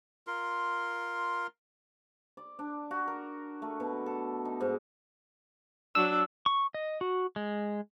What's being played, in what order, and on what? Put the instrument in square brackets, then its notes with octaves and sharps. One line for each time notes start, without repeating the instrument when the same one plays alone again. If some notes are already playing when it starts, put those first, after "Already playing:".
[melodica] F4 A#4 C6
[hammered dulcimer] D5
D4
F#4
A#4
A3
B2
A4
D#4
G#2
[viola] F#3 D4 [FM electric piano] E6
[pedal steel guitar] C#6
D#5
F#4
G#3